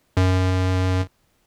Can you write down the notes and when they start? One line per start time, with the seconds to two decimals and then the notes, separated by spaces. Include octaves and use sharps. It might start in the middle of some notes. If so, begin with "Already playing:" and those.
0.17 F#2